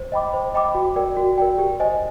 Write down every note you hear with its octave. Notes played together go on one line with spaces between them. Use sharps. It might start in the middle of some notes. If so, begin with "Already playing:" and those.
Already playing: C5
D#5 G5 B5 D6
C5
D#5 G5 B5 D6
F#4
A#4 D5 G5
F#4
A#4 D5 G5
G4
C5 D#5 G#5